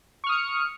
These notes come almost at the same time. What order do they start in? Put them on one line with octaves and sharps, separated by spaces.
C#6 F6 D#6 C#7